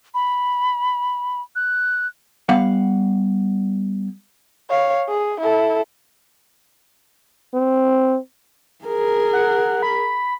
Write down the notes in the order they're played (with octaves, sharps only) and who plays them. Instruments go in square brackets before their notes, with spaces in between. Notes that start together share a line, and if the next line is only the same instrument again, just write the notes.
[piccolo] B5
F#6
[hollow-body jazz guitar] G3 B3 F5 F#5
[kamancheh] C#5 F5
G#4
E4 A4
[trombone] C4
[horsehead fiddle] G#4 A#4
[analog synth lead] F#5
B5